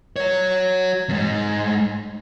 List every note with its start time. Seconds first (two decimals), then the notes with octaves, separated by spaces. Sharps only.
0.16 F#4 C#5
1.09 E2 G#2